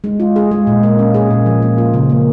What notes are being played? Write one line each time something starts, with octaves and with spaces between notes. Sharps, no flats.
G#3
F4
G#4
G#3
A#2
A#3
C#4
G#4
A#2
F3
A#3
F4
C#3
A#3